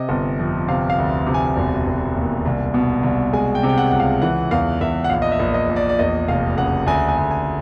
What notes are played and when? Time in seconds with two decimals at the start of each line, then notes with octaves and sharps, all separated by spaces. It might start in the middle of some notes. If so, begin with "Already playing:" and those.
Already playing: C3 D#5
0.09 G1
0.39 F2
0.68 C3 F5
0.90 F5
0.98 D2
1.26 C3
1.34 G#5
1.56 E1
1.86 E1
2.16 D#2
2.45 C2
2.74 B2
3.03 C2
3.33 G#3 G#5
3.55 G5
3.63 C3
3.69 G5
3.77 F#5
3.91 C#2 F#5
4.00 F5
4.22 E3 F#5
4.51 E2 F5
4.81 E2 E5
5.04 F#5
5.10 A#1 F5
5.22 D#5
5.32 E5
5.40 A#1
5.54 D#5
5.69 A#1
5.76 D5
5.89 D5
5.99 E2 D#5
6.28 F1 F5
6.57 C#3 F#5
6.86 D2 G#5
7.09 G#5
7.17 D2
7.31 G#5